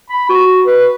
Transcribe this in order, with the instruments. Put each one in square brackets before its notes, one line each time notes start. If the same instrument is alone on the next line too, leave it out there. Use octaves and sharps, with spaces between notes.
[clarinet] B5
F#4
B4